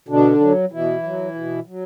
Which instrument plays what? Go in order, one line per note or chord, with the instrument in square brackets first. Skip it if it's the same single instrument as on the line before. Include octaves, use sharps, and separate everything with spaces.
[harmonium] B2 D3 D4
F#3
B2 E3 E4
F#3
B2
F#3